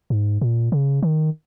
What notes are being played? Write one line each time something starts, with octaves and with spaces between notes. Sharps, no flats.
G#2
A#2
C#3
D#3